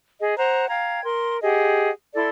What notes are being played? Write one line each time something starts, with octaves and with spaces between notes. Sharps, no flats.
G#4 D#5
C5 F#5 A#5 F#6
F5 G5 A#5 G#6
A#4 C6
G4 G#4 D#5 F#5
E4 A4 D5 C6